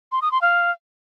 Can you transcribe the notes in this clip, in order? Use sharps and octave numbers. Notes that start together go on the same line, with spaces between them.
C6
D#6
C6
F5